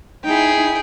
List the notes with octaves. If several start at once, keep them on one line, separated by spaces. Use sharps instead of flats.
D#4 E4 G#4 G5